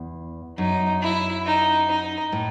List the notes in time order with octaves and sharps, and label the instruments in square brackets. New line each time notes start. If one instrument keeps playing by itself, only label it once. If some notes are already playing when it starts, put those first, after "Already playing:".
Already playing: [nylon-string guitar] E2
[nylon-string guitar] F#2 [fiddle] D#4
[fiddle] E4
D#4
D#4
[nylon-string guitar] A2